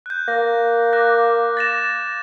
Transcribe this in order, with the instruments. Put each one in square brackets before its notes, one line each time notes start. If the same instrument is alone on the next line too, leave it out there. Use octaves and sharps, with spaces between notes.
[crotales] F#6 G6
[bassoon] A#3 [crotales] A#6
[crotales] D6 F#6 A#6
A6 A#6 E7